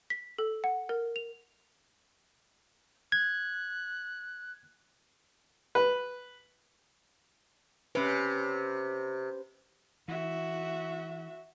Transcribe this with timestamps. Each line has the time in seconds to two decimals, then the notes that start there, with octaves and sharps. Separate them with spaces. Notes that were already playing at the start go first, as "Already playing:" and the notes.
0.10 B6
0.38 A4
0.64 F#5
0.89 A#4
1.16 F7
3.12 F#6 G#6
5.75 B4
7.95 C3 C#4 B4
10.08 E3 F#4 E5